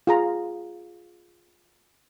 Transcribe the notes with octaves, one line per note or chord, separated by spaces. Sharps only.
F4 G#4 A#5